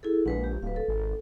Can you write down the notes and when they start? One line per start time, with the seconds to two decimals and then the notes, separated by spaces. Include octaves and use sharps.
0.03 E4 G#4 A4
0.26 A#1 G#3 B4 F#5
0.44 G4
0.63 D1 B4 F5
0.76 A4
0.88 G#1